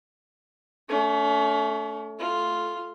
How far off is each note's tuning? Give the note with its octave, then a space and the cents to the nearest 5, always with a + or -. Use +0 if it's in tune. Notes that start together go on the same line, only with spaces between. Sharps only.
A3 +0 C#4 +40
A3 -15 F4 +0